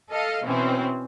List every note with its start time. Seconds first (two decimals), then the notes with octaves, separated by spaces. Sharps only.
0.10 A4 D#5 F5
0.44 B2 E3 C4 C#4